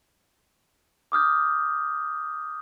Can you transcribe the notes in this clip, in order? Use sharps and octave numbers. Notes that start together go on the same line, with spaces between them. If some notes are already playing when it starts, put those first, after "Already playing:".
D6 D#6 F6 G6